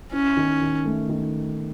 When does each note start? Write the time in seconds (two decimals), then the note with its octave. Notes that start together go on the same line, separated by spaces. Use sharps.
0.12 C#4 E4
0.37 D#3
0.61 D#3
0.85 A3
1.09 D#3